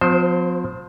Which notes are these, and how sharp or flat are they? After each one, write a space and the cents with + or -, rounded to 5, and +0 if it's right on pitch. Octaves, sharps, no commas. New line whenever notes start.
F3 +30 C4 -40 C5 +0